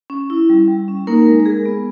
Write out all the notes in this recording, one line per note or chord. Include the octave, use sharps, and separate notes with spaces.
C#4
E4
G3
G3
C#4
A#3 D#4 A#4
G#3
A#4
G#3 G#4
B3